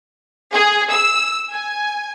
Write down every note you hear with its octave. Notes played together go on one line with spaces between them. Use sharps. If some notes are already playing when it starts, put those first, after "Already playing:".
G#4
E6
G#5